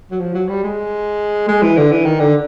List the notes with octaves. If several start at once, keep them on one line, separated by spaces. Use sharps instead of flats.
F#3
F3
F#3
G3
G#3
G#3
E3
D3
E3
D#3
D3